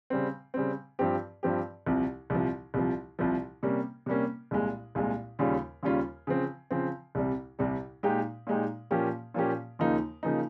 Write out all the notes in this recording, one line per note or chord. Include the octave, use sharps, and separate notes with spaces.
C#3 G3 C4
C#3 G3 C4
G2 F3 C4 G4
G2 F3 C4 G4
C2 C3 F3
C2 C3 F3
C2 C3 F3
C2 C3 F3
C3 G3 A#3 C#4
C3 G3 A#3 C#4
C2 A#2 G#3
C2 A#2 G#3
D#2 C#3 G3 C#4 F4
D#2 C#3 G3 C#4 F4
C#3 F3 C4
C#3 F3 C4
C2 C3 G3
C2 C3 G3
A#2 G#3 D#4 G4
A#2 G#3 D#4 G4
A#2 F3 A#3 C#4 G4
A#2 F3 A#3 C#4 G4
D#2 C#3 F3 A#3 D#4
C#3 F3 A#3 D#4